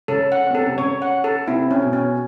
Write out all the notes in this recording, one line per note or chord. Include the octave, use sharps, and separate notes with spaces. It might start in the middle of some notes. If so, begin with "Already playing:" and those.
C#3 C#4 A4
F#5
C#4
C4
B3 A4
C3 C4
C#3 C#4 C#5
F#5
A4
C3 C4 E4
C#4
B2 B3
C#4